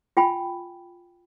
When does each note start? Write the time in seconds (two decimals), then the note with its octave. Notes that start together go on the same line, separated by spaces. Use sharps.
0.17 F4 G5 G#5 B5